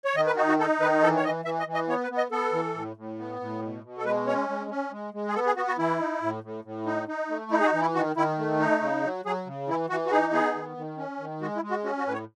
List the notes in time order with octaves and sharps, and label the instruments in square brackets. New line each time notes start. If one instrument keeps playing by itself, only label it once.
[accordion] C#5
D#3 D#5
B4
D#4 F#4
F#4
D#4 A4
D#3 B4
E3 A4
C#5
E3 D#5
E3 E5
D#5
E3
D#5
B3 C#5
B4
B3
D#5
B3 A4
E3
A2
A2
B3
A2
B2
B2
A4
G#3 B4
C#4 C#5
G#3
C#4
G#3
G#3
G#4
B3 A4
G#4
B3 F#4
F#4
E3 E4
D#4
A2
A2
A2
D#4
D#4
A3
D#4 E4
G#4
F#4
E3
E4
D#3 F#4
D#3 E4
A3
D#4
C#3
F#3
F#3 G#4
C#3
E3 E4
E3 F#4
F#4
D#4 G#4
B3 G#4
D#3
D#3
C#4
D#3
G#3 F#4
E4
G#3
F#4
C#4 F#4
F#4
A2 B4
C#5